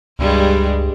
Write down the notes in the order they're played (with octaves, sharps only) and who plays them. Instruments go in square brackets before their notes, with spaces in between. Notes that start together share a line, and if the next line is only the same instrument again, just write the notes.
[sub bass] C#2 [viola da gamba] G2 G3 G#3